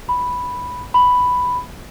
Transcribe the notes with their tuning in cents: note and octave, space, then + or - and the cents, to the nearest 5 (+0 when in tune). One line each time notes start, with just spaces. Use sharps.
B5 +0
B5 +5